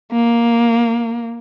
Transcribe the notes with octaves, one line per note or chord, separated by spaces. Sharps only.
A#3